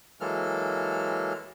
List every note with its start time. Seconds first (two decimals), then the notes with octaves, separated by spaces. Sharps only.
0.21 E3 F#3 G#3 A#3 A4 F6